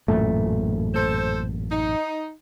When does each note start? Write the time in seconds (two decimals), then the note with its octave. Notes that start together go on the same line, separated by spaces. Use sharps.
0.08 A1 F#2 A#2 A3
0.94 A4 C5
1.70 D#4